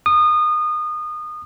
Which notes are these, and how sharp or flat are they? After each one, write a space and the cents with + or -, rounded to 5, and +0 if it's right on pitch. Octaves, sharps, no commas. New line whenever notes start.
D#6 -25